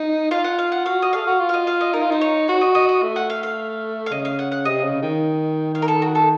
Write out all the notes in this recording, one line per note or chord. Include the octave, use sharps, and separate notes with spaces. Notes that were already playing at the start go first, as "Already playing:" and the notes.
Already playing: D#4
F4 F5
F#5
F5
F#5
F#4 F5
D#5
A4 F5
F#4
F4
F5
D#5
F5
D#5
D#4 A#4
F4
D#4 C5
C#5
F#4 C#5
D#5
D#5
D#5
A3
F#5
F5
F5
F5
C#3 D#5
F5
F#5
F#5
C3 D#5
C#3
D#3
D#3 F5
A#4
A4
F#4
A4